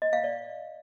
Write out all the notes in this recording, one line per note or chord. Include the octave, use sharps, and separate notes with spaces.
D#5
F5
D5